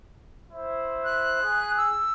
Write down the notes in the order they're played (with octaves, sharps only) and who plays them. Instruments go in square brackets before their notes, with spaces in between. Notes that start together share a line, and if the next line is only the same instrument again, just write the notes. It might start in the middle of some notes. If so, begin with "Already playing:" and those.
[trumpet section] E4 C5
[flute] F#6
[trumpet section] G#4
[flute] E6